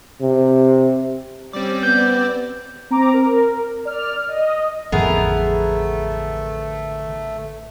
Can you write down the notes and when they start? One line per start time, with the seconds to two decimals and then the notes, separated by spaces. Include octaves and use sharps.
0.21 C3
1.53 G3 C4 C#4 D5
1.83 B3 G6
2.91 C4 A#5 D6
3.14 A#4
3.85 D5 F6
4.29 D#5
4.92 A1 F2 D3 A3 B3 G#4 A#4